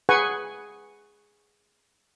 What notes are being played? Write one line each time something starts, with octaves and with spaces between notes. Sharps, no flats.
G#4 B4 F#5 G#5 C#6